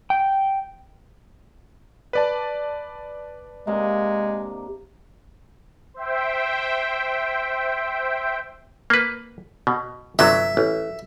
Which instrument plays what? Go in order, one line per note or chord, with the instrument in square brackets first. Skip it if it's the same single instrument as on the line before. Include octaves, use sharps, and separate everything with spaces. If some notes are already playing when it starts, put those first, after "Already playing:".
[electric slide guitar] G5
[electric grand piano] B4 D5 A5
[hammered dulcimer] C3 A#3 D4 [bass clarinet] G#3
[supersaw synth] C5 E5 G5
[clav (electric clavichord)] A#3 B4
B2
[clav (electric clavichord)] G1 C3 F#3 [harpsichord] E5
[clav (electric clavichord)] A1